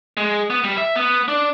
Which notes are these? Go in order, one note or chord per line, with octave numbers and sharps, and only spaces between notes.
G#3
B3
G3
E5
B3
D4